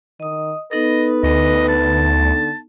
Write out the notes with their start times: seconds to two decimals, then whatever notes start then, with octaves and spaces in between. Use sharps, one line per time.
0.20 D#3 D#5 D#6
0.71 B3 D#4 A4 B4 D#5
1.23 D2 D#5
1.68 A5
2.22 D3